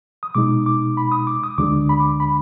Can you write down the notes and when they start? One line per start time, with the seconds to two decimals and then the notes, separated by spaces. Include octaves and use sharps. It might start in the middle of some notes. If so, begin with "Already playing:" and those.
0.23 D#6
0.35 B2 G#3 D#4 D6
0.66 D6
0.97 B5
1.12 D#6
1.27 D6
1.44 D#6
1.58 D2 D3 G#3 D4 D6
1.89 B5
2.00 D6
2.20 B5